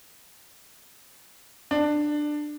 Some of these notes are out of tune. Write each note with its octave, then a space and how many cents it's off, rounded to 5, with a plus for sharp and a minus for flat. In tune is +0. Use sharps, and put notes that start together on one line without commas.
D4 +15